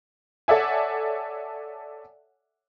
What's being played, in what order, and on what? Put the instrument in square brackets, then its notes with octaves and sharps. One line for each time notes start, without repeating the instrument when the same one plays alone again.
[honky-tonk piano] A4 C#5 D5 E5 F#5 G#5